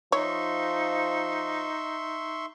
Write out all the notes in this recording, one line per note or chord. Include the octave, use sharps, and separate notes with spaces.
F3 D#4 C#5 E5 C6 C#6